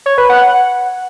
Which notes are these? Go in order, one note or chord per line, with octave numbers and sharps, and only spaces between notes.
C#5
B4
F#5